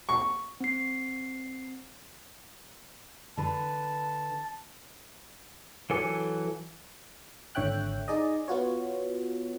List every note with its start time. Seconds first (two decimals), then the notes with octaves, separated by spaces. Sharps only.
0.09 C#6
0.60 C4 C7
3.37 D3 B4 A5
5.90 E3 F#3 A4 G#5 D6
7.55 G#1 D3 C#5 E5 G5 F#6
8.08 D#4 G#4 D5 D#5
8.48 B3 F4 F#4 C#5